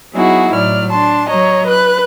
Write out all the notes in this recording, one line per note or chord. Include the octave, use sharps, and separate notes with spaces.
F#3 B3 D#4 E4 F#4 G#4
A2 F#3 D5 F6
D4 A5 C6
F#3 C#5 D#5 A#5
B4 F#6